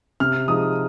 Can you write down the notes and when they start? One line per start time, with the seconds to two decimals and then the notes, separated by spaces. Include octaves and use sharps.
0.20 C3 F6
0.48 F3 G#3 D#4 D#6